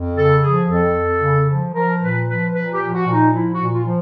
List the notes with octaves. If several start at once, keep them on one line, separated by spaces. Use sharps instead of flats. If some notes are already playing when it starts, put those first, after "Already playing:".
Already playing: F2
C#3 A4
F3 G#4
F2 A4
F2
C#3
F3
F3 A#4
A#2 B4
F3 B4
A#2 B4
G4
F3
F#4
A#2
D#4
F3 E4
F#4
A#2
F4
F3